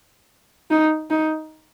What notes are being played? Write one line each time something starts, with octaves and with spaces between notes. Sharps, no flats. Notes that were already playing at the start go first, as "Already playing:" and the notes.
D#4
D#4